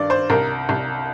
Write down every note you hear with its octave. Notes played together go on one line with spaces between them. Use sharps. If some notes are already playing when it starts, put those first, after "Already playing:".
Already playing: G2 D#3 D5
C5
C2 A#4
C2